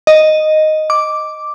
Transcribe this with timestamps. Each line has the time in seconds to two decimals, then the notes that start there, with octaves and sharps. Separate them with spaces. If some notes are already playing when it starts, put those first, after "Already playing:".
0.07 D#5
0.90 D6